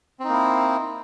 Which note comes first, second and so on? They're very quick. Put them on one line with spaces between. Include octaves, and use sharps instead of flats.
C4 D#4 A#3 E4